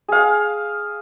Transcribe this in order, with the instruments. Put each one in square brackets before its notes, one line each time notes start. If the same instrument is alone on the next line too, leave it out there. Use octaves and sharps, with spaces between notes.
[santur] G#4 F5